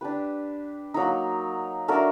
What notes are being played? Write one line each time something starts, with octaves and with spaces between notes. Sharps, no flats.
D4 G4 B4
F#3 A#3 D#4
A3 D4 F#4 A#4